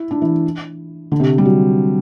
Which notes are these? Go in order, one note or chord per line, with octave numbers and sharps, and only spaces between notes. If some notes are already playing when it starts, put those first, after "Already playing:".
Already playing: E4
D4
E3
D3
C3
G3
F#3